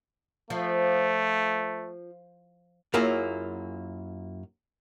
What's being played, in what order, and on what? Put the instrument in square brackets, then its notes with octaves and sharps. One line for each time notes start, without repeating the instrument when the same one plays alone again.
[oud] F3 [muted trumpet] A3
[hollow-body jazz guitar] F#2 F#3 A#3 E4 F4 G#4